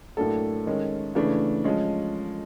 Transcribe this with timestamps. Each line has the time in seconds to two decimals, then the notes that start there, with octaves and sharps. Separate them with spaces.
0.17 A2 F#3 A#3 D4 A4
0.66 D#3 G#3 C#4
1.15 C#3 E3 A3 D4
1.64 F3 G#3 C#4